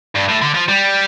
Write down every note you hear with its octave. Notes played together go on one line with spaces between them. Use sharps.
G2
A2
D3
F3
G3